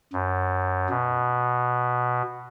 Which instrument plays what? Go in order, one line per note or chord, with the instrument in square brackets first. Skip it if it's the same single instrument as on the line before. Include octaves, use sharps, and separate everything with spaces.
[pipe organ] F#2
B2